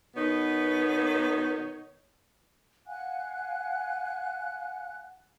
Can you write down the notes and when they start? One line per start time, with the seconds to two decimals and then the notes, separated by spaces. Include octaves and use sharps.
0.16 B2 D#3 B3 D#4 C#5
2.87 F5 F#5 G#5 F#6